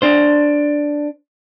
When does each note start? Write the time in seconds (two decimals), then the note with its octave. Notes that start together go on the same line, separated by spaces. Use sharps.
0.02 D4 C5